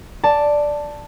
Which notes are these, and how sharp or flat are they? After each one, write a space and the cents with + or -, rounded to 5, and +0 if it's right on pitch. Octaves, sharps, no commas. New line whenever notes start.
D5 +0 A5 +5